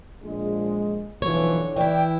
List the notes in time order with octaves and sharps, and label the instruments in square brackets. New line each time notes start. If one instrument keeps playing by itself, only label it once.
[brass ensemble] A#1 G#3
[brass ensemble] B1 E3 F3 [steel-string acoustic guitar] D3 C#5
[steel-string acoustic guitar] E3 E4 [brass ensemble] D5 G5